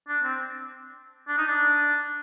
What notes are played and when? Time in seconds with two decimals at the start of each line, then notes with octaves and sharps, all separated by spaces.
0.08 D4
0.24 C4
1.28 D4
1.38 D#4
1.48 D4